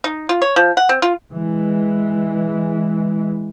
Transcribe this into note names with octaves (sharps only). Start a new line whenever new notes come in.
D#4
F4
C#5
F3
F#5
C4
F4
E3 G#3